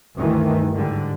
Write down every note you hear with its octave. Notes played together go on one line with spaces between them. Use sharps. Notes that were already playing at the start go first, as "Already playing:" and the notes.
D2 G2 D#3 E3 A3
G#2 D3 G3